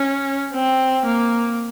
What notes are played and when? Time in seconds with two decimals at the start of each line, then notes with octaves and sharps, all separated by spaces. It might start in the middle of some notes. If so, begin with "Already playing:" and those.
Already playing: C#4
0.53 C4
1.06 A#3